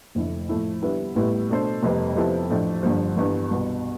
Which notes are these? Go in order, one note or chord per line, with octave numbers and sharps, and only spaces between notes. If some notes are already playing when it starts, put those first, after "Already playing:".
F1 F2 D3 A3 E4
A2 F3 A3 E4
D3 G3 B3 E4 B4
A1 A2 G3 B3 E4
B2 A3 D4 A4 C5
F1 F2 C3 G3 B3
C3 F3 B3 E4 A4
A1 A2 F3 A3 D4
G1 G2 D3 F3
G1 G2 E3 B3
C2 B2 B3